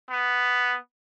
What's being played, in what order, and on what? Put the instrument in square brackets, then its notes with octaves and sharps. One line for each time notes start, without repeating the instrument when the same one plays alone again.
[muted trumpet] B3